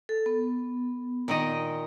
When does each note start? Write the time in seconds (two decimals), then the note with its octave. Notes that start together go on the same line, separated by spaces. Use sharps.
0.09 A4
0.26 B3
1.28 A#2 D#3 D#5